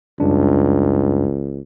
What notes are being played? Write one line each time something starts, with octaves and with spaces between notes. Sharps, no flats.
C#2 F#2 G3 D4